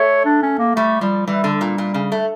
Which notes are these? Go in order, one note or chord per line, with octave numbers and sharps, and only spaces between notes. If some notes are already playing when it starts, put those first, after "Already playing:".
Already playing: A3 C#5
D4
C#4
A#3
G3 A3
F3 G3
E3 G3
D3
A#2
A#2
C#3
A3